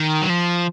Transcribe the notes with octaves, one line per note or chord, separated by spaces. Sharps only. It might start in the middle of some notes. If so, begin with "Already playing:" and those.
Already playing: D#3
F#3
F3